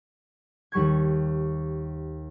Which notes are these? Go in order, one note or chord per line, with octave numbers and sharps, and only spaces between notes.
D#2 G3 C#6 G#6